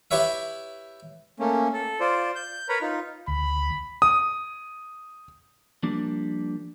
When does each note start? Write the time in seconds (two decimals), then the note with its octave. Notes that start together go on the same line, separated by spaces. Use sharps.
0.11 E4 G4 B4 C#5 E5
1.39 A3 A#3 C#4
1.73 A4
2.00 F4 C5 D5
2.35 G6
2.69 A#4 B4 C#5 A#5 B5
2.82 D#4 F4
3.27 D2 B5
4.02 D#6
5.83 F3 G3 A#3 D4